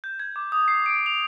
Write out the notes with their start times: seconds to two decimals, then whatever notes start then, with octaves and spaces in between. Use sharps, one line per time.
0.04 G6
0.20 G#6
0.36 D6
0.52 D#6
0.68 C7
0.86 D7
1.06 F7